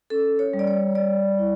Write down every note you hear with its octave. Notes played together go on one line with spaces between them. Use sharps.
C#4 A4
C#5
G3
D5
C#5
G3 D5
E4